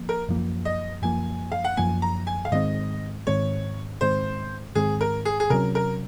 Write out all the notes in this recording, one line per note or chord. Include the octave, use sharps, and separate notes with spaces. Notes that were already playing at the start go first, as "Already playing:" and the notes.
Already playing: F3 A#3
A#4
F#2 F3 A#3
D#5
F#2 F3 A#3 G#5
F5
F#5
F#2 F3 A#3 G#5
A#5
G#5
F5
G#2 D#3 G#3 C4 D#5
G#2 D#3 G#3 C4 C#5
G#2 D#3 G#3 C4 C5
G#2 D#3 G#3 C4 G#4
A#4
G#4
G#4
C3 F#3 C#4 A#4
A#4